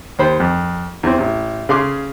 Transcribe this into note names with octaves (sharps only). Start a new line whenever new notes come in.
D#2 C5 B5
F2
E2 C4
A1
C#3 G#4 F5 C6 D6